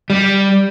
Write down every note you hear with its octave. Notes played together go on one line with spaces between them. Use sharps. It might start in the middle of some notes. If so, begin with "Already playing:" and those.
G3